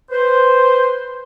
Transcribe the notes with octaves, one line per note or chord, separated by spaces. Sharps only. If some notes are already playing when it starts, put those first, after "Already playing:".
B4 C5